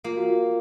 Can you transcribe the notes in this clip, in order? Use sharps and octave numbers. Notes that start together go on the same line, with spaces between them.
A#3 F4
F#4
F4